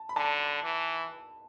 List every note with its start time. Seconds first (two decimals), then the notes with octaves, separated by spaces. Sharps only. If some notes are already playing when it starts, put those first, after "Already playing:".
Already playing: A5
0.09 B5
0.16 D3 A5
0.63 E3